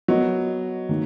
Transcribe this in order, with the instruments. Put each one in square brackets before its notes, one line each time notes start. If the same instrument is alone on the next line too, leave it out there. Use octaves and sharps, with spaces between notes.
[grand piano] F#3 [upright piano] B3 F#4 A#4 D#5
[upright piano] D#3 A#3